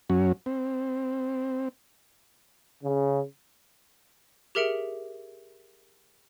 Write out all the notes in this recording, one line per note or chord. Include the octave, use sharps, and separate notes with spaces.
F#2 F#3 C#4
C4
C#3
G4 G#4 A#4 E5 C#7 D7